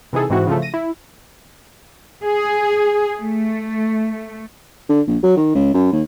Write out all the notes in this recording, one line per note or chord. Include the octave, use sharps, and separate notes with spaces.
C3 E3 D#4 G#4 A4
G#2 E3 C4 E4 F#4
C#3 F3 A3
A#6 D#7
E4
G#4
A3
D3
A#1
F#3
D#3
C#2
F#2
D#2